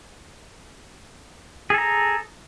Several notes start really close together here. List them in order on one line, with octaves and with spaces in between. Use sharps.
G#4 A4 A#5